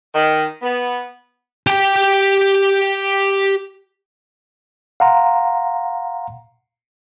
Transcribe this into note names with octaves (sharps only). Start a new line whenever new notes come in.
D#3
B3
G4 G5
F5 F#5 A#5 C6